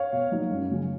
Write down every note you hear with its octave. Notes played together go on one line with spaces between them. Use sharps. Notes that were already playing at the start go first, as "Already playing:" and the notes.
Already playing: C#5 F5
B2
F#3 A#3 D#4
F#2
C#3 F#3 C#4